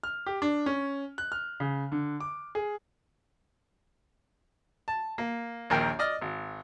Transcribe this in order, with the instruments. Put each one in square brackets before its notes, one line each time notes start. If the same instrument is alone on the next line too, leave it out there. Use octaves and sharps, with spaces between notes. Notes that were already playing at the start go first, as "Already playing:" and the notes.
[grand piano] F6
G4
D4
C#4
F#6
F6
C#3
D3
D6
G#4
[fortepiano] A5
A#3
A#1 D#2 A#4 G5
D5 D#5 F6
G#1